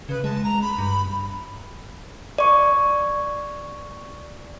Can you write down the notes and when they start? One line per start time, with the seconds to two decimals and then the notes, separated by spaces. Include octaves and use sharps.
0.09 C#3 B4
0.24 G#3 A5
0.43 A#5
0.61 B5
0.78 G2
2.38 D5 C#6